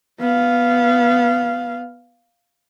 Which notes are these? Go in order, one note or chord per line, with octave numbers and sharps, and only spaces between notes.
B3 F5